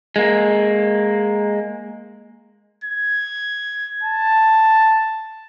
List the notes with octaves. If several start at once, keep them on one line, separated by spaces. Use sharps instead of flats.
G#3 A#3
G#6
A5